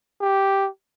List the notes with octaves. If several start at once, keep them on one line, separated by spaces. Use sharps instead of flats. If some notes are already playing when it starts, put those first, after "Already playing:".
G4